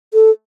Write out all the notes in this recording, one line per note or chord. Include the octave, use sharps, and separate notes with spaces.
A4